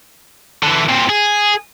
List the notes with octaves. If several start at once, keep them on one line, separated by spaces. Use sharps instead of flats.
D3 E3
A#2 C4
G#4